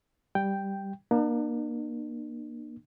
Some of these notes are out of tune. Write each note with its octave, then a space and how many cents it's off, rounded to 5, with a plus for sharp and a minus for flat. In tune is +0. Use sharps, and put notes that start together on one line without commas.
G3 +0 G5 +0
A#3 +25 D4 +45